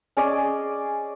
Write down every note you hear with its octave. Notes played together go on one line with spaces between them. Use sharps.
C#4 G#4 D5 D#5